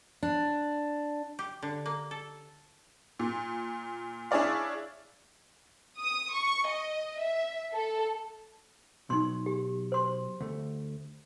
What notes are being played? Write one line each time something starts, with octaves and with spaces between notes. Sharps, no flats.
D4
G4
D3
A#3
A4
A#2
D4 E4 G#4 C#5 D5 F5
D#6
C#6
D#5
E5
A4
B2 F#3 D#4 C6
G4
C5 C6
D2 A3